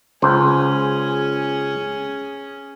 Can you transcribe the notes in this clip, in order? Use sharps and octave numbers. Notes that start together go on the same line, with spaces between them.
C#2 C#4 G#4 C5